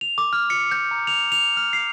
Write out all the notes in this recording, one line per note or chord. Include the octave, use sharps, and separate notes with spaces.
F7
D6
F6
C#7
G6
A#5
F7
F7
F6
C7